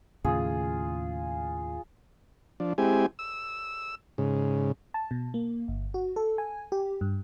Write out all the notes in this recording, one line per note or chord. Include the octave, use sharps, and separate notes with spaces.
D#2 A2 C#3 F4 G#4
F3 D4
G#3 C4 E4 G4 G#5
E6
G#2 C#3
A5
B2
A#3
G1
F#4
A4
G#5
G4
G2